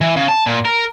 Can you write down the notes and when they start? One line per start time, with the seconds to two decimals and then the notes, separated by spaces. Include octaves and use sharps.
0.01 E3
0.17 C#3
0.28 A5
0.46 A#2
0.65 A#4